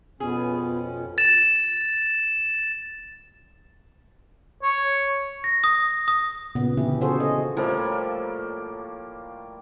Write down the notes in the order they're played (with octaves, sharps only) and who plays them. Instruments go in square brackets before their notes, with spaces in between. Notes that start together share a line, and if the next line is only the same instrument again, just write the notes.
[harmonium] F2 B2 C#4 [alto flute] B3 [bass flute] F4 [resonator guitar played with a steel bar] G#4
[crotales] A6 E7
[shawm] C#5
[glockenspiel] A#6
D#6
D#6
[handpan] A#2 C#3 B3
D3 E3 C#4 E4 G4
C#4 F4 F#4 G#4 A4 C5
D#5
[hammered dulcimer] A2 F3 G3 A#3